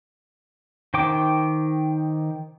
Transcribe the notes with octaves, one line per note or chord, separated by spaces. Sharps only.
D#3 C5 G5 D6